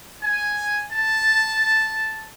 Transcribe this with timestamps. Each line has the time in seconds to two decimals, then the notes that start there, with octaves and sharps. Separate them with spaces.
0.24 G#5
0.92 A5